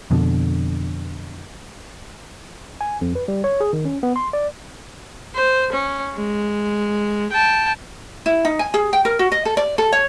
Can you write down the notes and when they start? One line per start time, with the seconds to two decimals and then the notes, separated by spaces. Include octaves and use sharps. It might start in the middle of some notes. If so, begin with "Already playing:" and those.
0.11 F2 B2 D3
2.81 G#5
3.01 F2
3.15 B4
3.28 G3
3.44 C#5
3.60 G#4
3.73 D#3
3.85 C#4
4.03 B3
4.16 C6
4.33 D5
5.35 C5
5.72 C#4
6.15 G#3
7.32 G5 A5
8.26 E4
8.45 D#4
8.59 G#5
8.74 G#4
8.93 G5
9.05 A#4
9.19 F#4
9.32 D#5
9.45 A4
9.57 D5
9.78 A4
9.92 C#5